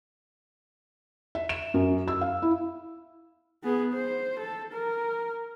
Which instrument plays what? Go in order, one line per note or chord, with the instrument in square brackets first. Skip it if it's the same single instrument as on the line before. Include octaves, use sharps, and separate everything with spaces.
[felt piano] E5
E7
F#2
E6
F5
E4
[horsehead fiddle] B3 G#4
C5
A4
A#4